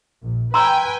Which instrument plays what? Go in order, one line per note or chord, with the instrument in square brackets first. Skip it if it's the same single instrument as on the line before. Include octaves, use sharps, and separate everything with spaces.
[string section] A#1
[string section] B4 G5 G#5 [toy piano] A#5 C6 E6